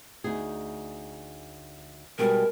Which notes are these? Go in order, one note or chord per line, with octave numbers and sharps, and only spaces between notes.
D2 D#4 G#4
B2 G3 G#3 A#4